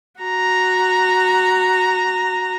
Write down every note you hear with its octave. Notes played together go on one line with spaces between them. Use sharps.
F#4 A#5